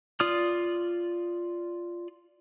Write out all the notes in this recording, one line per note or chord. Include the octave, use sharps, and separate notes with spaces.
F4 D5 D#6 F6